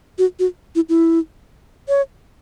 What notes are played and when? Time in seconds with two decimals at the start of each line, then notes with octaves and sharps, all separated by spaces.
0.18 F#4
0.39 F#4
0.75 E4
0.89 E4
1.89 C#5